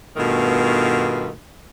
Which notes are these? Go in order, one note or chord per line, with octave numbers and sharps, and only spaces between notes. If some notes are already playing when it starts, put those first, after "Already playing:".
G2 B2 D#3 A3 B3 F4